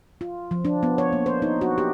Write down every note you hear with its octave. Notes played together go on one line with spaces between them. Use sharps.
F4
F3
D4
B3
C#5
A#3
C5
D#4
F#4
G4